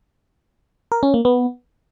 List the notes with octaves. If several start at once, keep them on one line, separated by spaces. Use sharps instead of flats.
A#4
C#4
A#3
B3